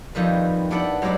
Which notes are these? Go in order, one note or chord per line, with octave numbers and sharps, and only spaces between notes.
F2 D#3 G3 B4
B3 D4 E4 D5 F#5 G5
G2 F#3 G#3 D4 D5 B5